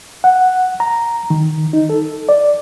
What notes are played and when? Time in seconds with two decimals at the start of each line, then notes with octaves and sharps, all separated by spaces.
0.24 F#5
0.80 A#5
1.30 D#3
1.73 D#4
1.90 A4
2.29 D5